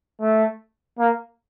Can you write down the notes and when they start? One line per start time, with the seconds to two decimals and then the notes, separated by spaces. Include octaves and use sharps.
0.21 A3
0.99 A#3